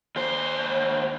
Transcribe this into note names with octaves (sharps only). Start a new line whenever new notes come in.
D#2 C5